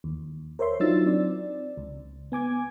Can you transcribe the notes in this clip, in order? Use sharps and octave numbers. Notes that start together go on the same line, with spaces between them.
D#2
A#4 C5 C#5 E5 C6
F#3 D4 D#4 F4 E6 A6
C4 D5
C#2
B3 G#5 D6 G#6